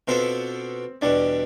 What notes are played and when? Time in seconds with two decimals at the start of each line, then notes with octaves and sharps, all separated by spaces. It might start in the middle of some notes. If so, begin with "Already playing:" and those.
0.08 B2 B3 C4 D4 F4 A4
1.02 E2 B2 G3 D4